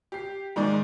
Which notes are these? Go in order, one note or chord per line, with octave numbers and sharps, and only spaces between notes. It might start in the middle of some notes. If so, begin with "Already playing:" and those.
G4 C7
G#2 D#3 G#3 D5